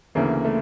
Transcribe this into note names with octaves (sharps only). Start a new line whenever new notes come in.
D2 C#3 E3 A#3
A3